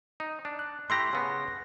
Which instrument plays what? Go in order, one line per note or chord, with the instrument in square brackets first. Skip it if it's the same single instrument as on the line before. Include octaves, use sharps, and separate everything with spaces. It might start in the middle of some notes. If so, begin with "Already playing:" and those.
[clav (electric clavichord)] D#4
D4
[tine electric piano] F#6
[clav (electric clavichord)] A3 E4 G4 [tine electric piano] C6 F#6 A#6
[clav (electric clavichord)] C#3 B3